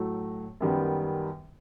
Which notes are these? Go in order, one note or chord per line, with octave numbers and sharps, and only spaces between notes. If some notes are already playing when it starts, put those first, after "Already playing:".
Already playing: A2 F#3 A3
F#2 D#3 G3 B3